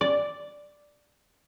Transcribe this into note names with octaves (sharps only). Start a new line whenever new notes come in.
D5